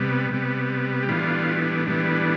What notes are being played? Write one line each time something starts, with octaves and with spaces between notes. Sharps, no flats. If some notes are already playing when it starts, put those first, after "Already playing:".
Already playing: C3 G3 B3
C3 G3 B3
G4
A2 E3 G3 B3 D4 F4
A2 E3 G3 B3 D4